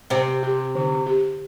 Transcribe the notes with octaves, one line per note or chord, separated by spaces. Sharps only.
C3 C4 C5
G4
D3
G4